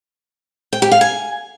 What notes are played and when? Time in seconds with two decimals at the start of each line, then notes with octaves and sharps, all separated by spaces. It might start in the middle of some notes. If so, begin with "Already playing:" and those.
0.73 G5
0.82 G4
0.92 F5
1.01 G#5